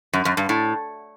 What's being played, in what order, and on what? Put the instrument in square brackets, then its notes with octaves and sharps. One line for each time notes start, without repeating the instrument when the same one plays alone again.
[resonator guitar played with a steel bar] F#2
F#2
G2
A2